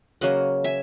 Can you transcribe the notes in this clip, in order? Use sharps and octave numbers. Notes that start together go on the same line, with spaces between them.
C#3 F#3 A#3 D#5 F#5
E5 G#5